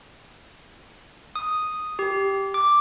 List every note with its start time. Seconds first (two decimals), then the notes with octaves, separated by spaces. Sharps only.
1.36 D#6
1.99 G4
2.54 D6